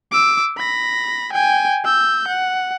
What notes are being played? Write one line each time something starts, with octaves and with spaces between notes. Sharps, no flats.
D6 E6
B5 A#6
G5 G#5
E6 G6
F#5